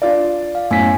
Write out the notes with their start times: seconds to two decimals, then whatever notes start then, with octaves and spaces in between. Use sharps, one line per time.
0.02 D4 F4 D5
0.55 F5
0.71 F#2 A2 A3 B3 G#5 B6